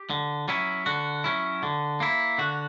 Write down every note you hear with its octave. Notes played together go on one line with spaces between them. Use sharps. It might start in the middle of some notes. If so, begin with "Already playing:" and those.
Already playing: G4
D3
F#3 C#4 E4
D3 F#4
F#3 C#4 E4
D3
A#3 E4
D3 F#4